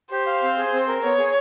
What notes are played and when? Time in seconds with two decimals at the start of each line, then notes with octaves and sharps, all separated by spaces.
0.11 G4 C5
0.26 F5
0.43 C4
0.58 G#4
0.73 C4
0.88 A#4
1.03 B3 C#5
1.18 G#4